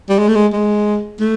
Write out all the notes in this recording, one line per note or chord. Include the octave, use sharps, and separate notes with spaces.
G3
G#3
A3
G#3
G#3
A3